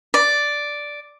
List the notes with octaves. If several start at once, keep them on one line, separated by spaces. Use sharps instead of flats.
D5